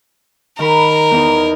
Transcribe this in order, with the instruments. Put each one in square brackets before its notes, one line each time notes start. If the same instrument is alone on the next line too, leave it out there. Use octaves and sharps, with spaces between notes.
[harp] D#3 B5 [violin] A#4
[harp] E2 D#4